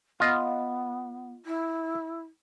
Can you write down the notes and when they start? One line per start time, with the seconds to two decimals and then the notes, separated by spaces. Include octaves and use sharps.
0.20 B3 F4 D#5
1.45 E4